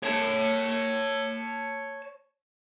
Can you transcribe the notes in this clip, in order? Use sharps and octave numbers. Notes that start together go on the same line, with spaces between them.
C#5 A5